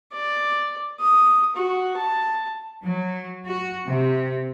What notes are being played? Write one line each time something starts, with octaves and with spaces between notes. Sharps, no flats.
D5
D#6
F#4
A5
F#3
F#4
C3